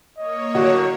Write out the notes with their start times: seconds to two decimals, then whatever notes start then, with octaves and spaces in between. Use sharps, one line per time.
0.18 A#3 C#5 D#5
0.55 A2 D3 F#3 F#4